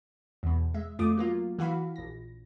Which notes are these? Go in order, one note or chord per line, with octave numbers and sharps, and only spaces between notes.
E2 B2
G#3 E5
F2 A3 F4 D6 D#6
F#3 A#3 F4
E3 F#4 F5 B5
A#1 A#6